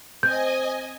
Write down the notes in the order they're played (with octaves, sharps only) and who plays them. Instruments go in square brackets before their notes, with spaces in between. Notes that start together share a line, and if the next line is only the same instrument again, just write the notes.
[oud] C4 [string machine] D#5 G#5 [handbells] G6